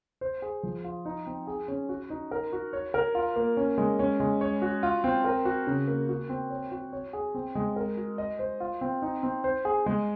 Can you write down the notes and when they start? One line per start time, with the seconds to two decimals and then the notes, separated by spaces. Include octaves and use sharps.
0.21 C5
0.42 G#4
0.63 F3
0.84 F4
1.05 D#4
1.26 C4
1.47 G#4
1.68 C#4
1.89 F#4
2.10 D#4
2.31 A#4
2.53 F#4
2.73 C#5
2.94 A#4
3.15 F4
3.36 A#3
3.57 C#4
3.78 G#3
3.99 C#4
4.20 G#3
4.41 C#5
4.62 F#4
4.83 F4
5.04 C4
5.24 A#4
5.45 F#4
5.67 C#3
5.87 A#3
6.09 F#4
6.29 C4
6.50 C#5
6.71 F#4
6.93 C#5
7.13 G#4
7.35 C4
7.55 G#3
7.76 A#4
7.97 F#4
8.18 D#5
8.39 C5
8.60 F4
8.81 C4
9.02 D#4
9.23 C4
9.44 C5
9.65 G#4
9.86 G#3